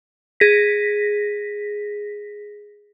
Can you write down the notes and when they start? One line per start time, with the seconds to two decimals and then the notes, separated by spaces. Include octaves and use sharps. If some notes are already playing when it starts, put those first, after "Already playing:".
0.40 G#4 A#6 B6